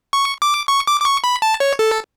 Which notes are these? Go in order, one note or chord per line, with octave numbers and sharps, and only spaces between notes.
C#6
D6
C#6
D6
D6
C#6
B5
A5
C#5
A4